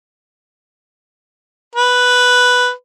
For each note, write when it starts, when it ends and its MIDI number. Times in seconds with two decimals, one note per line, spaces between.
1.75 2.71 71